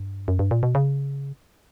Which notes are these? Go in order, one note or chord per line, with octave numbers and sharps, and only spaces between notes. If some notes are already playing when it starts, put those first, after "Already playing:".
Already playing: G2
F#2
G2
A#2
B2
C#3